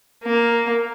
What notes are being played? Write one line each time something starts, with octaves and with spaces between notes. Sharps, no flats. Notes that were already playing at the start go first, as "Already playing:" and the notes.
A#3